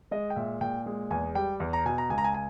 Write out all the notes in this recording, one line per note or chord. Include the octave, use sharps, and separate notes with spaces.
G#3 D#5
G5
A#2 E5
A#2 G5
G#3
E2 G#5
G3 G5
E2
A#5
B2 G#5
A#5
C#2 G#5
A#5
G#5
G#5